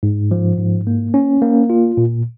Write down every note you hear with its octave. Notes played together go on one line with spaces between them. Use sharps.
G#2
F3
G#2
A#3
C#4
A#3
F4
A#2